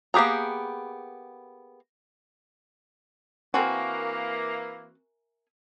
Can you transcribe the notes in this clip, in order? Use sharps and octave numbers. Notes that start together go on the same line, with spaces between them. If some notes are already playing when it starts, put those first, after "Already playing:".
A#3 B3 G4 G#4 A#5
E3 A#3 C4 F#4 A#4 E5 G#5